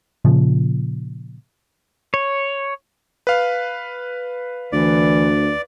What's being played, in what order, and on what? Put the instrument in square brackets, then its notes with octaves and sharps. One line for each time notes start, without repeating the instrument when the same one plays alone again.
[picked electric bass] A#2 C#3 F3
[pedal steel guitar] C#5
[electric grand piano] B4 F5
[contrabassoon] D2 [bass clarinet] E3 [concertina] D5